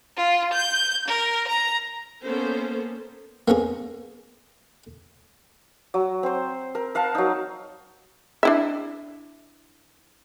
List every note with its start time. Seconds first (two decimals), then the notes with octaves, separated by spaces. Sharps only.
0.16 F4
0.53 G6
1.08 A#4
1.48 A#5
2.22 A#3 B3 C#4 A4 A#4 C5
3.48 A#3 B3 C#4 G#4
5.94 F#3
6.23 C4 C5
6.75 A#4
6.95 A#4 F5 F#5 A5
7.15 F#3 D#4
8.43 D4 E4 E5